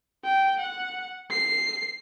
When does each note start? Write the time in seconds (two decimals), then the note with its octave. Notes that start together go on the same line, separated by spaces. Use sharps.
0.24 G5
0.60 F#5
1.30 C7